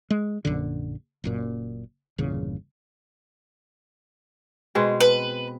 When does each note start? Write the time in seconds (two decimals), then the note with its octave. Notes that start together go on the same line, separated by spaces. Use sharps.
0.10 G#3
0.45 A#1 F#2 D3
1.24 F#1 F#2 A#2
2.18 G1 E2 A#2 C#3
4.75 B2 G#3 C4
5.00 B4